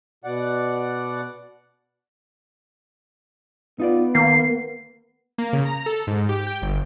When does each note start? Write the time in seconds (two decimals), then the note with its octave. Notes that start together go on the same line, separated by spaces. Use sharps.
0.24 B2 D5 F#5
3.80 B3 D#4 F4 D5
4.15 D#3 A#3 C7
5.38 A#3
5.53 C#3
5.65 A#5
5.86 A4
6.07 G#2
6.29 G4
6.47 G5
6.62 G1